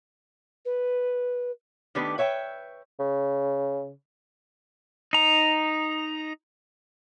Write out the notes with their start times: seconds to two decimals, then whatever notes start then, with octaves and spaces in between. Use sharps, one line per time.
0.65 B4
1.95 D#3 A3 B3 D4 G4 B4
2.18 B4 C#5 E5 F#5 G5
2.99 C#3
5.13 D#4 A#5